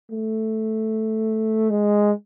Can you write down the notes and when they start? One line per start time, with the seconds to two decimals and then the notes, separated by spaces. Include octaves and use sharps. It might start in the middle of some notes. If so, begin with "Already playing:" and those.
0.11 A3
1.70 G#3